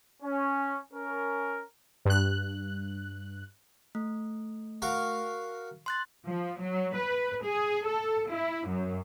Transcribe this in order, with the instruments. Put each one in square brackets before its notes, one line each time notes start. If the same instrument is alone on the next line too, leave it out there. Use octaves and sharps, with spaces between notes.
[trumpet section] C#4
C#4 A#4
[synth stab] G2 F#6
[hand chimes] A3
[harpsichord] F#4 A#4 F5
[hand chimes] C6 F#6 A6
[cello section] F3
F#3
B4
G#4
A4
E4
F#2